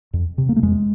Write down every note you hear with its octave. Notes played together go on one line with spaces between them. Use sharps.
F2
C3
A#3
A3
F2 G#3